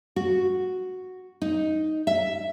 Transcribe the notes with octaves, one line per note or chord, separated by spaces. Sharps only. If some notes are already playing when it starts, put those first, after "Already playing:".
F#4
D#4
E5